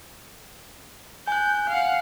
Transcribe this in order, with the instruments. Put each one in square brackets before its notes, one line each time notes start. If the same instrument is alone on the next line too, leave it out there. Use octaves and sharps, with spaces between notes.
[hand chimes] G#5 F#6 [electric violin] G6
[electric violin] F5 F#5